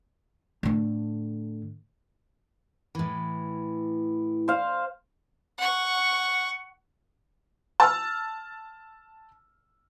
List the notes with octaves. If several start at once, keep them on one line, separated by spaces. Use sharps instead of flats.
A2 D3
A2 E3
C5 F5
F#5 C#6
A5 E6 F6